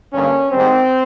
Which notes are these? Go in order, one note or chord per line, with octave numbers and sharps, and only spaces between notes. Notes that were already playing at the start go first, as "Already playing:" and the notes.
G2 D3 G3 A#3 C#4
G#2 D#3 G3 C4